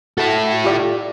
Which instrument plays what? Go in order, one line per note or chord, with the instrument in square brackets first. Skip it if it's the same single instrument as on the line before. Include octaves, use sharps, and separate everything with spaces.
[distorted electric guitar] E4 A4 [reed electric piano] F#4
[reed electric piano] F4 G4 D5